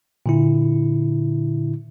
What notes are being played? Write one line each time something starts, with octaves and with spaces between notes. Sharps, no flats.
A#2 D3 E4